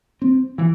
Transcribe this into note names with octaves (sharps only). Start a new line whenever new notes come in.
C4
E3